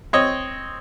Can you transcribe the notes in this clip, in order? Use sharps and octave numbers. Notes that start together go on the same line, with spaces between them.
C4 C#5 D#5